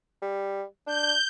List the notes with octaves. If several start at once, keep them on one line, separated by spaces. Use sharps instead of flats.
G3
D4 G6